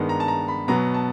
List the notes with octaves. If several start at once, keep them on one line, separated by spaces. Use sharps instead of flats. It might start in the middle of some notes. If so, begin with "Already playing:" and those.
Already playing: G2 D#3 G#3 B3
A#5
A5
A#5
B5
B2 F#3 B3 A#5
A5